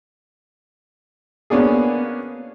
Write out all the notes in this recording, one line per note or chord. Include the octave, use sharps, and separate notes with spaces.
A#3 B3 C#4 D4 G#4